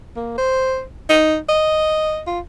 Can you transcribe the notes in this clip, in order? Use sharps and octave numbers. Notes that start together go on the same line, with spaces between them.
A#3
C5
D#4
D#5
F4